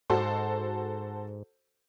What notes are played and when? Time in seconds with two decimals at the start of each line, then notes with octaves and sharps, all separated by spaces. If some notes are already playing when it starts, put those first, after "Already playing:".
0.10 G#2 F#4 A4 C5